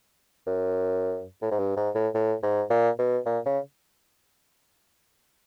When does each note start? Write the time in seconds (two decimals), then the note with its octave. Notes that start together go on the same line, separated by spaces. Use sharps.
0.47 F#2
1.42 A2
1.51 G#2
1.59 G2
1.77 G#2
1.95 A2
2.15 A2
2.43 G#2
2.70 A#2
2.98 B2
3.26 A#2
3.45 C#3